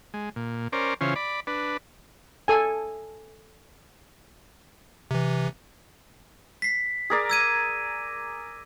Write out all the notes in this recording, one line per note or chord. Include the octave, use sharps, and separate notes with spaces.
G#3
A#2
C#4 A#4 C5 D5
C#3 E3 C#4 F4 C5
D5 B5
D4 B4
A4 G#5
C3 E3
B6 C7
G#4 A#4 D5
E6 G#6 D#7